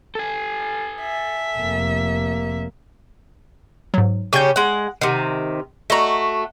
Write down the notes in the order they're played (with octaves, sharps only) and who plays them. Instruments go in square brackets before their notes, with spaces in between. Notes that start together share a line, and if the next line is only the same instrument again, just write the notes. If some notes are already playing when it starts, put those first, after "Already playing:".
[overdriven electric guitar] A4 G#5
[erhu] E5
[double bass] F1 A#3
[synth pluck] G#2 F#3
[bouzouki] C#3 C#4 G4 [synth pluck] C#6 G6
[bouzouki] G#3 F#5
[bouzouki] C3 D#3 [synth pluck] F#5
[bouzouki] A3 F#4 [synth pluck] D#5 A#5